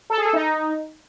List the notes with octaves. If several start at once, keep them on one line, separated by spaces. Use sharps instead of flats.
A4
G#4
A4
D#4